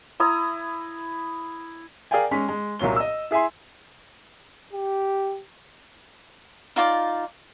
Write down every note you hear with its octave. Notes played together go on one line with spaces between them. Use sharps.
E4 A#5 D#6
G#4 A#4 D5 F5 G5 G#5
G#3 C#4 G#5 B6
G#3
C2 A#2 F#3 C#5 G7
D#5 E6
E4 G#4 E5 G#5 C6
G4
D#4 F4 D5 D6